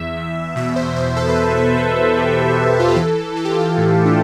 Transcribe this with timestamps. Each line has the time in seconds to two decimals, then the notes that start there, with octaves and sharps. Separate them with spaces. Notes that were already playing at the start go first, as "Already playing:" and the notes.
Already playing: E2 E5
0.17 E2
0.56 B2 E5
0.76 C5
0.96 E2 C5
1.16 A4
1.28 B4
1.36 E2 C5
1.57 B4
1.77 B2 B4
2.17 B2 G4
2.57 E2
2.80 F4
2.88 G4
2.96 E3 A4
3.36 E3 A4
3.45 G4
3.51 F4
3.60 G4
3.77 A2
4.06 D4